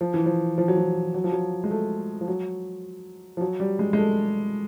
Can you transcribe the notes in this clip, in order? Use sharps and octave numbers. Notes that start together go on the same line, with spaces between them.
F3
E3
F3
F3
F#3
F3
F#3
F3
F#3
G#3
A3
F3
F#3
F3
F#3
G3
G#3
G#3
A3